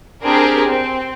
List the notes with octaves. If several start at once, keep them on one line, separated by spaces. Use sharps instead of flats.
C4 D4 G4 G#4 A#4
C4